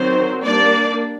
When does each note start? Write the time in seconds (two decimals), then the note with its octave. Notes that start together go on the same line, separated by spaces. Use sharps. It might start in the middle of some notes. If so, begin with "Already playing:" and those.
Already playing: D#3 F#3 C4 C5
0.44 G3 A#3 D4 D5